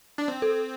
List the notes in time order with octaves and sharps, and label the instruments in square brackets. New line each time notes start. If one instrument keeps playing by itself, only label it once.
[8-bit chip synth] D4
C4
[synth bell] A4